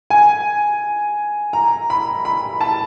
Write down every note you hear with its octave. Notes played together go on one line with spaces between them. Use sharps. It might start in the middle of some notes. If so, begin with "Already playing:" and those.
G#5
A#5
B5
B5
A5